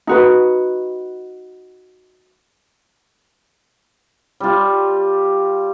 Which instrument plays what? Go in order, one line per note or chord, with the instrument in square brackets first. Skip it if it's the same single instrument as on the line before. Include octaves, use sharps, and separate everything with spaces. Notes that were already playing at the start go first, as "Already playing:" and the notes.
[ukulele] D#4 F#4 B4
[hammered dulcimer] G3 F4